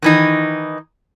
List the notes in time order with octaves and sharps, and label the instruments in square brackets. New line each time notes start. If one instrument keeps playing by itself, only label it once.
[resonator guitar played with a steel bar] D#3 E3 D#4